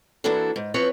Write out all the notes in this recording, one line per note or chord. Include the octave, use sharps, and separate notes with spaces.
E3 A#3 D4 E4 F#4 A4
G#2
E3 F3 B3 C4 B4 C#5